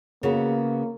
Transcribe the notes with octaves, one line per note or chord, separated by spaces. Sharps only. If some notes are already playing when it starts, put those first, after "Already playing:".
C#3 A#3 B3 F#4